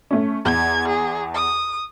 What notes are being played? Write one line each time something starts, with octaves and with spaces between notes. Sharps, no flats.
A3 C#4
E2 G#6
G#4
D#6